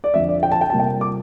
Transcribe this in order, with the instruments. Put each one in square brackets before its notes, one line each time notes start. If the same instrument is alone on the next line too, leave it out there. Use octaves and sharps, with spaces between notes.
[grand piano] D5
F2 D3 F3 C4 E5
D5
G5
A5
G5
C3 G3 A#3 F4 A5
G5
D6